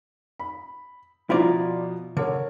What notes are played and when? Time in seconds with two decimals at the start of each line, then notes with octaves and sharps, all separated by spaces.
0.40 B5
1.30 B2 F3 E4 F4 D5 A#5
2.17 D3 A#4 C#5